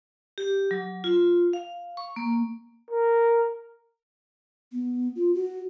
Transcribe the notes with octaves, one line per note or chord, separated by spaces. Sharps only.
G4
F#3
F4
F5
C#6
A#3
A#4
B3
F4
F#4